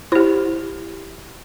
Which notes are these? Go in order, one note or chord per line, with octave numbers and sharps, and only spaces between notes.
E4 G4 C5